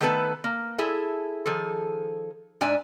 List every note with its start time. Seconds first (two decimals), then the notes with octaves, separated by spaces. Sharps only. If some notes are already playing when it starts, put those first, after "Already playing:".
0.01 D#3 A3 B3 A4 B4 A5
0.44 A#3
0.78 E4 G#4 A4 E5
1.46 D#3 F3 G#4 A4
2.61 G#2 D4 E5 G#5